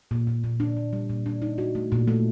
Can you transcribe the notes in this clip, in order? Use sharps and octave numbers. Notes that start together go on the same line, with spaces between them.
A#2
A#2
A#2
D4
A#2
G3
A#2
D4
D#4
F#4
A3
A#2
A3